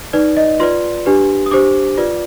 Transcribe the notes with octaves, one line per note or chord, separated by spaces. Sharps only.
D#4 B4 D5
D#5
F4 B4 D5 C6
D4 G4 B4
D#6
D4 G4 C5 D6
F4 B4 D5